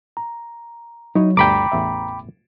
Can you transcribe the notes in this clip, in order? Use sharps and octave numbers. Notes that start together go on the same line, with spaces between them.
A#5
F#3 D#4 E4 C#5
G1 D2 G3 G5 A#5 B5 D6
A1 E2 E5